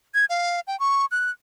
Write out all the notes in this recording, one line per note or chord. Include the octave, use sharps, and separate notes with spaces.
G#6
F5
G5
C#6
F#6